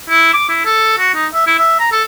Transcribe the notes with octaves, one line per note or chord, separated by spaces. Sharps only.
E4
D6
E4
A4
F#4
D#4
E5
E4
E5
A#5
A4